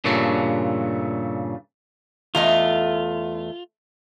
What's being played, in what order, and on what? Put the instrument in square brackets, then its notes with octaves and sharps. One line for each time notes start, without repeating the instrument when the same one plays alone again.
[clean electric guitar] G2 A#2 C#3 E3 A3
[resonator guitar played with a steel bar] E2 A3 D#5 [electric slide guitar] F4